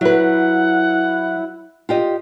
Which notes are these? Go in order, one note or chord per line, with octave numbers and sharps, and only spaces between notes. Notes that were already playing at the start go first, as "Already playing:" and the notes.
F#3 E4 B4 F#5
F4 G4 D#5